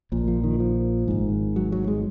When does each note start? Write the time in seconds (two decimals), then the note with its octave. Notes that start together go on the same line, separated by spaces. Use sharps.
0.12 A#1 A#2
0.28 F3
0.44 D#3
0.60 F3
1.08 G#1 G#2
1.56 F#3
1.72 F#3
1.88 G#3